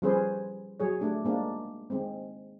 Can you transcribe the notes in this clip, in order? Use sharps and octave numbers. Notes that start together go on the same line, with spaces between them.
F3 G3 C#4 G#4 B4 C5
F#3 G#4 C#5
A3 D4 G4
G#3 A#3 D4
D#3 G#3 C4